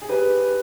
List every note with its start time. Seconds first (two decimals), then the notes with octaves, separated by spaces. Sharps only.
0.02 G#4
0.09 G4 B4